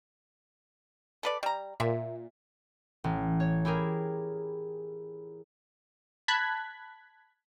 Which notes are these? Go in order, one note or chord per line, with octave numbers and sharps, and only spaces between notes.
A4 B4 D5
G3 A#5
A#2 E5
A1
C#5
E4 G4 G#4 A#4
A5 B5 F#6 G#6 B6